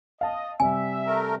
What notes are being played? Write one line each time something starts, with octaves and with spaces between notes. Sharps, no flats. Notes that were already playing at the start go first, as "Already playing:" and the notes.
D#5 F5 A5
C3 G3 E5 G#5
A3 A#4